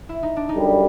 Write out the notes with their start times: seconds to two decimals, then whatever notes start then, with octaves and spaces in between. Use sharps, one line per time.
0.09 E4
0.23 D#4
0.36 D4
0.49 D#4
0.55 F#2 D3 G3